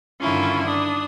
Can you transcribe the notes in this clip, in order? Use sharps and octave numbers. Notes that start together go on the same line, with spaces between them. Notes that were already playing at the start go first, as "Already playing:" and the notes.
G2 D3 D#3 C#4 E4 F4
D4 D#6